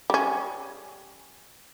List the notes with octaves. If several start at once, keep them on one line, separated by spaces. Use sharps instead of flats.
G3 C#4